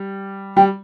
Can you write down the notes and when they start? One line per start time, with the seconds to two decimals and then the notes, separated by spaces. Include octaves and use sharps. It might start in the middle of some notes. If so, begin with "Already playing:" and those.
Already playing: G3
0.57 G3 G5